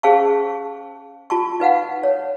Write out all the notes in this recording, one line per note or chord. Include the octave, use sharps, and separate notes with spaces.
C#4 G#4 C5 F5 A5 C#6
F4 A5 C#6
D#4 B4 F5 F#5
C#5